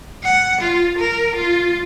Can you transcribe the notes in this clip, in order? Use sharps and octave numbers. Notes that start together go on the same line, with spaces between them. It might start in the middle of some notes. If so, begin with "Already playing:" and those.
F#5
F4
A#4
F4